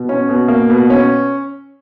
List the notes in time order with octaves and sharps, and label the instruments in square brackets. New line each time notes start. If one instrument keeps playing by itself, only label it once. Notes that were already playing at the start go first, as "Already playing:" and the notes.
Already playing: [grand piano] B2
C#4
B2
A#3
B2
C#4